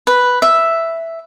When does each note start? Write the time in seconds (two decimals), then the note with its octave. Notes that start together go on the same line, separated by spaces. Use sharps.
0.07 B4
0.42 E5